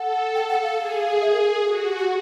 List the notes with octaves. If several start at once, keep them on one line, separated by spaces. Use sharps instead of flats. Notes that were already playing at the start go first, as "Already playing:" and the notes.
Already playing: A4 F#5
G5
F#5
F5
G#4
E5
A#4
A4
A#4
F#4 A4
G#4
G4
G4